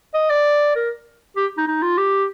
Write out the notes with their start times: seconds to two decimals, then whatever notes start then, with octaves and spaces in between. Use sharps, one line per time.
0.14 D#5
0.30 D5
0.76 A#4
1.37 G4
1.58 D#4
1.68 D#4
1.82 F4
1.98 G4